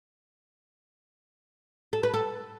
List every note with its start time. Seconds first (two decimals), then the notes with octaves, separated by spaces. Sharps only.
1.93 A4
2.03 B4
2.14 A4